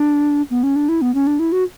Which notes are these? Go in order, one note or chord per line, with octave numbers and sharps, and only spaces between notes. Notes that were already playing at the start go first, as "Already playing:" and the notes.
Already playing: D4
B3
C#4
D4
E4
B3
C#4
D4
E4
F#4